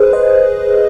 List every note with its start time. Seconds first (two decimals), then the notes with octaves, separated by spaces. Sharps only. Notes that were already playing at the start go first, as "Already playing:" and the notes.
Already playing: G#4 B4 C5
0.13 C5 D#5